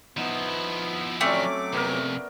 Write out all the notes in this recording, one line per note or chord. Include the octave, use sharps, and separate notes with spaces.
F3 B3 D#4 E4
F#3 A3 C4 C#4 D5 D6
F2 C3 B3 A#4